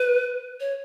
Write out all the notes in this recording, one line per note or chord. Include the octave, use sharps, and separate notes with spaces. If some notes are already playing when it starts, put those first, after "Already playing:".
Already playing: B4
C#5